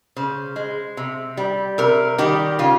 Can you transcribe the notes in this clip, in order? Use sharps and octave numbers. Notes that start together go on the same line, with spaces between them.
C#3 C5
G#3
C3
G3
C3 A#4
D#3 G3 G4
C#3 F4